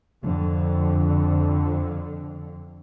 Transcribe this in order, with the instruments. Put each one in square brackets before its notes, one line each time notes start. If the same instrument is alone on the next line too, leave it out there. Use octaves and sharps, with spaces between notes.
[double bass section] F2 D3